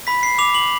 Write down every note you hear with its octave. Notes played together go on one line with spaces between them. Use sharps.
B5 B6
C7
D6 F7
F#7